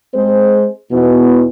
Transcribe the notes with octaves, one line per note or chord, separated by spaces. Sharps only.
G#3 C4 G#4 C5
E2 B2 E3 B3 D#4